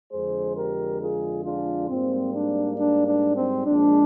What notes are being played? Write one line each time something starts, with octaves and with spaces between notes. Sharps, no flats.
F2 D3 G#3 G#4 C5
G4 A#4
F4 G#4
D4 F4
G#2 G3 A#3 C4
D4
D4
D4
C4
A#1 A#2 G#3 D4